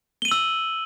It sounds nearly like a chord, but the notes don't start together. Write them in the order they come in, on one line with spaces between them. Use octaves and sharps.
G7 D#7 F#7 E6